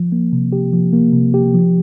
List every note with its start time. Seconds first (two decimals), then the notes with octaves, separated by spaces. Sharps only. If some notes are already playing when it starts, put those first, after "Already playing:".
Already playing: F3
0.12 A#3
0.32 C3
0.52 G4
0.73 F3
0.93 A#3
1.13 C3
1.34 G4
1.54 F3